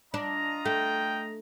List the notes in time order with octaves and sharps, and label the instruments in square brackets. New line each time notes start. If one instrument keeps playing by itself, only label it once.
[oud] D4 [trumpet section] F4 D#5 A#5
[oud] A3 [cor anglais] G5